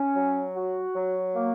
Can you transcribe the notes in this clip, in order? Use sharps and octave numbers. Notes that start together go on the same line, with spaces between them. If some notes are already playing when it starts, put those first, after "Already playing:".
Already playing: C#4
F#3
F#4
F#3
A#3